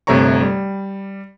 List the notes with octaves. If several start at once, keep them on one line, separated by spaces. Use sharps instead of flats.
G1 C3 A3 C#5 A#5 C#6
G3